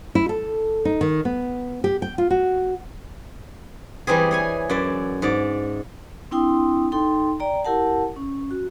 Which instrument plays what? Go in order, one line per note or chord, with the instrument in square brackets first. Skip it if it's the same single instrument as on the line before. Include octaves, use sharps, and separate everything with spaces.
[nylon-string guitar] E4
A4
D#4
D#3
B3
G4
G5
F4
F#4
[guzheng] E3 G3 C4 G#4
G#4 C#5 G#5
F#2 D5 E5
G#2 D5
[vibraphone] C4 D4 E4 G5 C6 D#6
D#4 A4 G5 C6
D5 G5 A#5
E4 G4 A#4 F#5 A5
C#4
F#4